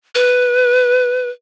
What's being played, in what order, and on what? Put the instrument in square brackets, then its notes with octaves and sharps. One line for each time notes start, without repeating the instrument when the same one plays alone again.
[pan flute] B4